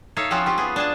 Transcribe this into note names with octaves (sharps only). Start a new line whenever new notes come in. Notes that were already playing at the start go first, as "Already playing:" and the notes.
D#4 A4 C#5 E5 F5
F3 C4 C#4 D#4 F4 F#4
F4 G4
B3 G#4
D4 G#4 A5